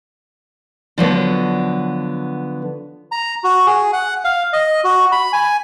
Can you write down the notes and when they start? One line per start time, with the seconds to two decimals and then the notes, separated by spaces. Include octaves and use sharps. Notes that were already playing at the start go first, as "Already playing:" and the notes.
0.98 D3 F3 F#3 B3
3.12 A#5
3.44 F#4
3.67 G#4
3.93 F#5
4.24 F5
4.53 D#5
4.84 F#4
5.12 B5
5.33 G#5